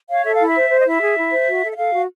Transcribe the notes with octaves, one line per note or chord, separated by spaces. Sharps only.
C#5 F5
A4 E5
E4 F5
E5
C5
C5
D#5
E4 E5
G#4
E4
C5
F#4
A4
E5
A4 F5
F#4